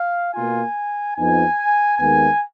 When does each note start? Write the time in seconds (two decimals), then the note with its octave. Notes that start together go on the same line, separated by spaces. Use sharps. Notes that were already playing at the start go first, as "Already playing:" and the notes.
Already playing: F5
0.33 B2 A#3 F4 G#5
1.16 F2 F3 B3 D#4 G#5
1.98 D#2 D#3 G#3 B3 G#5